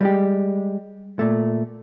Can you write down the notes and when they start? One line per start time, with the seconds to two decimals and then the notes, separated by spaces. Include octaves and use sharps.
0.01 G3 G#3 G4
1.19 A#2 A3